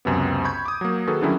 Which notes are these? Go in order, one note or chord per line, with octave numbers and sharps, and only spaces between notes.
C#2 F#2 C3 B3
B5 C#6 G6 G#6
D6 D#6
F#3 A#3
D#3 F#4 G#4 A4 B4
D3 D#3 F#3 G3 C#4 E4